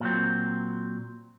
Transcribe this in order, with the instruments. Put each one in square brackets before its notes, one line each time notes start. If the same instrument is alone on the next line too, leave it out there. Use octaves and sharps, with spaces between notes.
[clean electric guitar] A#2 F#3 C4